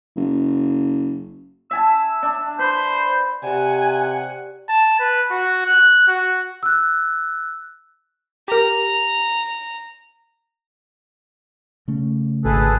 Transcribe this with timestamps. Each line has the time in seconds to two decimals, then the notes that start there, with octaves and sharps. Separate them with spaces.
0.16 F#1
1.71 E5 G#5 A5 E6
2.23 D4
2.59 B4 C5
3.44 C3 G4 D5 F#5 G#5
4.69 A5
5.00 B4
5.31 F#4
5.66 F#6
6.08 F#4
6.63 E6 F#6
8.48 G4 A#4 A#5
11.88 C#3 A3 C#4
12.45 G#1 G#4 A4 B4